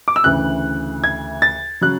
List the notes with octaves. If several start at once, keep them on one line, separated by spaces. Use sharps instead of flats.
D6
E6
D2 C#3 E3 F#6
G#6
A6
C#3 F#3 F#6